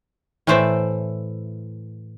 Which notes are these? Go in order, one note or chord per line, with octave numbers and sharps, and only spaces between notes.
A2 E3 A3 C5 D5 E5